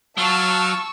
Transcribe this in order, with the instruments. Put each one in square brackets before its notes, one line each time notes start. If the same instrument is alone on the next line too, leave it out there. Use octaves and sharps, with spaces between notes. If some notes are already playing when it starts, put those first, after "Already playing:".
[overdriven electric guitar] F#3 [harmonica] F5 [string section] A5 [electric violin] C#6 E6